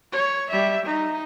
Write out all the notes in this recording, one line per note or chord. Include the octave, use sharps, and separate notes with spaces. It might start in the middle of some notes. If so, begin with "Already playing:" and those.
C#5
G3 E5
D#4